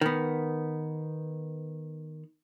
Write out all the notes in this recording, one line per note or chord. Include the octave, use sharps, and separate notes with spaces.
D#3 B3